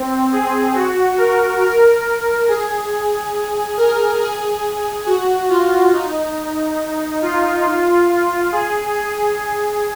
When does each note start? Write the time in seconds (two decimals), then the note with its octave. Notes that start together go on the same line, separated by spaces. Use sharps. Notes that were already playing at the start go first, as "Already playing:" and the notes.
Already playing: C4
0.32 G#4
0.75 F#4
1.18 A#4
1.61 A#4
2.48 G#4
3.77 A#4
4.20 G#4
5.06 F#4
5.49 F4
5.93 D#4
7.22 F4
8.52 G#4
8.95 G#4